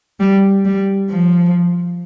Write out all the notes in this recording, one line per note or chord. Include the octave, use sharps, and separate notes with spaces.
G3
G3
F3